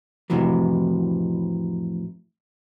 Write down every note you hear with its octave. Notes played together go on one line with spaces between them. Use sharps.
F2 A2 C3 E3 F#3